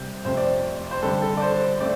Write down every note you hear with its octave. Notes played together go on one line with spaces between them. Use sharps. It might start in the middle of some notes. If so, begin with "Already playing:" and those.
Already playing: C3 G3 C4 G6
F2 C3 A3 C4 C5
D5
C5
G2 D3 G3 C4 A4
A4
D5
C5
A3 C4 D5